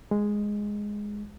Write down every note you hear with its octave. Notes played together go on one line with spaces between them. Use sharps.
G#3